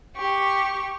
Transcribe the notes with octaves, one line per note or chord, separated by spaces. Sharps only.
G4 C#6